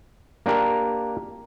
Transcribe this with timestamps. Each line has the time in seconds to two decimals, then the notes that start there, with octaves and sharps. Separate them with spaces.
0.46 A#3 D4 G4 A#4